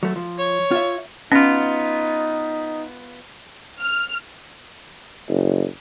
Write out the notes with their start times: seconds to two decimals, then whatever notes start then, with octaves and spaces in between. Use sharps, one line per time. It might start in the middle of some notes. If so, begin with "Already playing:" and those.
0.03 F#3 A3
0.16 F3
0.39 C#5
0.71 F4 E5
1.32 B3 C#4 D#4 F4
3.81 F6
5.29 F#1